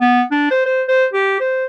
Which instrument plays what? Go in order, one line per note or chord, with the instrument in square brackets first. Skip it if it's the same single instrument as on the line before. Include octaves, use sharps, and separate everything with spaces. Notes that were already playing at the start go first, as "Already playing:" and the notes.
[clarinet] B3
D4
C5
C5
C5
G4
C5